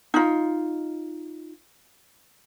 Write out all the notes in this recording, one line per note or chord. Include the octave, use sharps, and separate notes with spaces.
D#4 F4